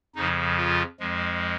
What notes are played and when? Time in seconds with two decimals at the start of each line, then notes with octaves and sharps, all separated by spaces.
0.15 F2 C#3 F3 D#4
0.57 F4
1.00 F2 F3 G#3